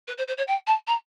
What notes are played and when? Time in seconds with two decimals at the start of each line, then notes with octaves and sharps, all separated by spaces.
0.08 B4
0.18 C5
0.28 C5
0.37 C#5
0.48 G5
0.67 A5
0.87 A#5